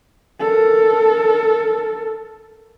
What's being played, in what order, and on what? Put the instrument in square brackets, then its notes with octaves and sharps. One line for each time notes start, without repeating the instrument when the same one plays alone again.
[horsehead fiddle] A4 A#4